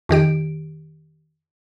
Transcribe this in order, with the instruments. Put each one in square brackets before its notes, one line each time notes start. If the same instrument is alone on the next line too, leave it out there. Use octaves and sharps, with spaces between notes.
[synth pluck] F2 D#3 G4 D7